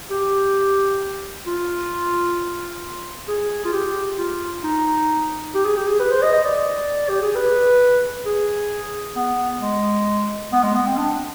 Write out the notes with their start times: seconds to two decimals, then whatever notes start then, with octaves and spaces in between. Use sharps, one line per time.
0.10 G4
1.46 F4
3.28 G#4
3.65 F4
3.72 G4
4.18 F4
4.63 D#4
5.54 G4
5.65 G#4
5.77 G4
5.88 G#4
5.99 B4
6.11 C5
6.22 D#5
6.33 D#5
6.45 D5
7.09 G4
7.22 G#4
7.35 B4
8.26 G#4
9.16 B3
9.62 G#3
10.52 B3
10.63 G#3
10.75 B3
10.86 C4
10.97 D4